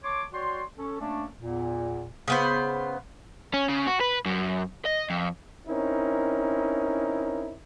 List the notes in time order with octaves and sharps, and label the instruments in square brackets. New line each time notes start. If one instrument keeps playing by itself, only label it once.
[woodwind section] C#5 A5 C6 D6
F#4 C#5 D5 G5 C6
C#4 A4
A3 A#3 C#4 D4
E2 A#2
[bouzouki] C#3 B3 C5
[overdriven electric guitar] C#4
C#3
F#4
B4
F#2
D#5
F2
[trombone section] C4 C#4 D#4 E4 A#4